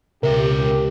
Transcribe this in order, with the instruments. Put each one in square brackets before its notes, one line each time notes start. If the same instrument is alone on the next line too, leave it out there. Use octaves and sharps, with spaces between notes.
[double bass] C#2 [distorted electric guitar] B2 E5 [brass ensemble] G4 [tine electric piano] A#4